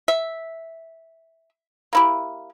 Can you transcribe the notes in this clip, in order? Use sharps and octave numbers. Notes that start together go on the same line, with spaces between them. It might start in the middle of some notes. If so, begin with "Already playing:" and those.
E5
A#3 E4 G4